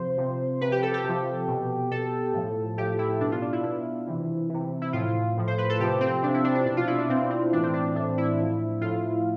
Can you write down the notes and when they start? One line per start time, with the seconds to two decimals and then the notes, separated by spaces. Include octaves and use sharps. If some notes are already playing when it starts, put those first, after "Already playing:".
Already playing: C3 F3 C5
0.18 C3 F3
0.61 C3 F3 B4
0.72 G4
0.82 A4
0.94 G4
1.04 C3 F3
1.48 B2
1.91 B2 A4
2.33 A2 F3
2.77 A2 F3 G4
2.99 E4
3.20 B2 D4
3.32 F4
3.42 D4
3.53 E4
3.64 B2 E4
4.07 C3 E3
4.49 C3 E3
4.82 E4
4.93 A2 F3 F4
5.37 A2 F3
5.47 C5
5.58 B4
5.69 A4
5.80 C3 F3 G4
6.01 C4
6.22 C3 F3 D4
6.34 E4
6.44 D4
6.55 D4
6.66 B2 D4
6.77 F4
6.87 E4
6.98 D4
7.09 B2 C4
7.30 C4
7.53 A2 E3 D4
7.63 C4
7.73 D4
7.95 A2 E3 D4
8.18 E4
8.38 A2 F3
8.81 A2 F3 F4